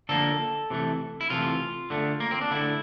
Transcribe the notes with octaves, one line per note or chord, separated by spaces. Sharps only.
D3 F3 A#3 A4
C3 E3 A3
E4
C3 E3 A3 F4
D3 A3
A#3
C4
D4
D3 A3 E4